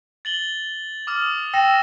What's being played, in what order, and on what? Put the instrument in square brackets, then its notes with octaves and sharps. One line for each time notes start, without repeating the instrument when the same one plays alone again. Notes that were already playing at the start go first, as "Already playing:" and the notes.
[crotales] A6 F#7 G7
D6 D#6 F6
[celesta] G5 [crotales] E6 A#6 E7